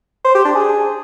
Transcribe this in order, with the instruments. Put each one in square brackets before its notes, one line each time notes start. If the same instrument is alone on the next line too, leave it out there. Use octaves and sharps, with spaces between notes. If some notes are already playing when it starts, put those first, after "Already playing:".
[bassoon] C5
G4
D4
G#4